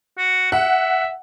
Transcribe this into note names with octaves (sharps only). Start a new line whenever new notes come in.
F#4
E5 F#5